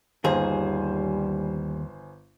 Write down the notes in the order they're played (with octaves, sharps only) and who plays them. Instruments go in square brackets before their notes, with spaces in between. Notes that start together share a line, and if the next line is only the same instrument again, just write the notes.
[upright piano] G1 C5 G#5 [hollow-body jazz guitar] D#2 D#3 G#4 [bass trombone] G3